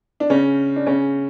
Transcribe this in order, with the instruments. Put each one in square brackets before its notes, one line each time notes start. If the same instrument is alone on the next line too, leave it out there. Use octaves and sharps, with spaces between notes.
[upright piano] D4
C#3 C#4
D4
C#3 C#4